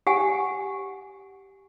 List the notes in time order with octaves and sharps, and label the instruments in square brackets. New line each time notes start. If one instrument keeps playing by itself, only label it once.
[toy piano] G4 F#5 G#5